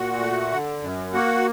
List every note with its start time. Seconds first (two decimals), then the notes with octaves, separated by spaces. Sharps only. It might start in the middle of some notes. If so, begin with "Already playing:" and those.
Already playing: A#2 F#4 F#5
0.20 A3
0.52 D3
0.82 F#2
1.13 A#3 F#4 F#5